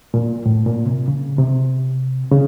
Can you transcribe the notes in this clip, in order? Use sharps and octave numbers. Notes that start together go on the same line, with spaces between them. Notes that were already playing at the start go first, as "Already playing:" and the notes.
A#2
A2
A#2
C3
C#3
C3
C#3